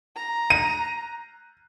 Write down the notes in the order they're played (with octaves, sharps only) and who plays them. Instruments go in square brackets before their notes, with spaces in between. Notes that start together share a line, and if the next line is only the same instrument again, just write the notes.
[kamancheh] A#5
[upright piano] D#7